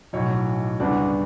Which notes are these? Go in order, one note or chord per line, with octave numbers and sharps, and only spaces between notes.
B1 A2 F#3 C#5
D2 C#3 G3 B3 D4